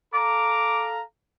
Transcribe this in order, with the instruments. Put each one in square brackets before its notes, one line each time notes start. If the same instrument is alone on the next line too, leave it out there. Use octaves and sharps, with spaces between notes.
[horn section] A4 F5 A#5 [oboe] D6